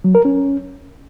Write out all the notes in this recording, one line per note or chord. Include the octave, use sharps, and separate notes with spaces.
F#3
A#4
C#4